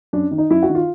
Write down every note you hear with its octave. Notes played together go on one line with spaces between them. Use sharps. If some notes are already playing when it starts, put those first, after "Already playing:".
F#2 D4
D#3
D#4
F#2 E4
F#4
D#3
F4